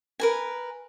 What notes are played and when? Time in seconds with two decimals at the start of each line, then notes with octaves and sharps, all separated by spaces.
0.20 A#4 B4 G#5